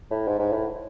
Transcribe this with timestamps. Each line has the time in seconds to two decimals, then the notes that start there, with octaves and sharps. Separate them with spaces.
0.11 A2
0.27 G#2
0.39 G#2
0.52 A2